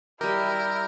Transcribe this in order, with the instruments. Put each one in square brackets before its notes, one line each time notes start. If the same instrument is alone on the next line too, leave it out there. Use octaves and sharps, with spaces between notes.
[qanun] G3 D#5 [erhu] E4 [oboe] G4 [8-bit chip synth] A#4